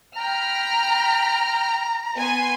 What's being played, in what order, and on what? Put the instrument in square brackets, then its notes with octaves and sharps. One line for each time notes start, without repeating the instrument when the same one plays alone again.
[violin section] G5 B5 F6 [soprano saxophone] A#5
[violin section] B3 G#5 C6